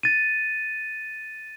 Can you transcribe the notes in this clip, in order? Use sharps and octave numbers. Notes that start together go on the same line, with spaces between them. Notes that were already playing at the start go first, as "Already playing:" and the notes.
A6 D#7